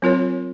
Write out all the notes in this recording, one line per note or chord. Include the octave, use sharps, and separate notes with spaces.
F#3 C4 F4 A#4 C#5